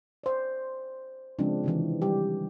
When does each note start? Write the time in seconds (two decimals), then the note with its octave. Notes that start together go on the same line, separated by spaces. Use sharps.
0.24 C5 D5
1.39 C#3 F3 G#3 C4 D4
1.64 C3 D#3 E3
2.02 G3 G4